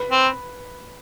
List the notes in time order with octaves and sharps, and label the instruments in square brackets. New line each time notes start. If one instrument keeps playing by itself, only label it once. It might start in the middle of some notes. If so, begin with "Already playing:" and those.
Already playing: [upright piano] B4
[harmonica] C4